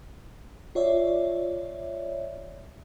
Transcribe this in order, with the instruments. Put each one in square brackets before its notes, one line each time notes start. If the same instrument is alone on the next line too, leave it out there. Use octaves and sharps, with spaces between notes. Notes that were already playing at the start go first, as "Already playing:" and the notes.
[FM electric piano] F4 C#5 D5 E5